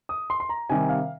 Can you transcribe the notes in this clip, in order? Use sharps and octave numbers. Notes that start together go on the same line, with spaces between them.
D#6
C6
C6
A#5
C3 D#3 G3 G#5
F5